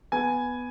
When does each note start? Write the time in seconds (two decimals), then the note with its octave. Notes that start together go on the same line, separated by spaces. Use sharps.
0.12 B3 G#5